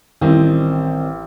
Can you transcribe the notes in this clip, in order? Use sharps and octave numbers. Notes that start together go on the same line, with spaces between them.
A1 D#3 G3 C4